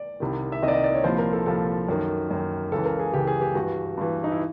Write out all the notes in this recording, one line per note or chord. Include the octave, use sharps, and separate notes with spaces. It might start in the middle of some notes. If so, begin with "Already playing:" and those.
Already playing: D5
C2 C3 D#3
E5
C2 C3 D#3 D#5
D5
D#5
D5
C#5
C2 A#2 F3 C5
A#4
A4
C2 A#2 F3 A4
F#2 D#3
F#2 D#3
C#2 C#3 E3 A4
A#4
G#4
C#2 C#3 E3 G4
G#4
G4
G2 E3 F#4
G2 E3
D#4
E4